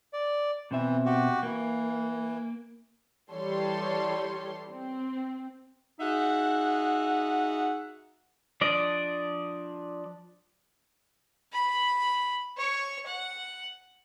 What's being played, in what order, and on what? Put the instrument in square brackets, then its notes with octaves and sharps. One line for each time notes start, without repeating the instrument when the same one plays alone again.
[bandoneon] D5
[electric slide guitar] B2 C4 E5 [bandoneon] E3
[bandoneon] F#4 G4
[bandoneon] E3 [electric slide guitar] A#3
[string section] E3 G3 A4 C#5 C6
C4
[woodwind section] D#4 F#4 G#4 E5 F#5
[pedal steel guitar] F3 D4 D5 D#5
[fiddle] B5
C#5 C#6
F#5